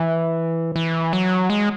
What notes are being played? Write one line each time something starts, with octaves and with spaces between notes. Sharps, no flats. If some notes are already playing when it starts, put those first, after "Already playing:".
Already playing: E3
E3
F#3
G#3